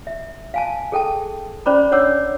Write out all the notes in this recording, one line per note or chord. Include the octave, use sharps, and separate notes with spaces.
E5
F5 G#5 A5
G#4 A4 G5 A5
C#4 C5 D5 A#5 B5 D6
D4 C#5 F#5 D6 E6